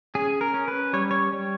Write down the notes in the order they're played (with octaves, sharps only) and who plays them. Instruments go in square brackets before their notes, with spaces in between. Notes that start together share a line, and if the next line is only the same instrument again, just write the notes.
[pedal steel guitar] C#4 G#4
A#4
C#4
B4
G3 C#5
C#5
G3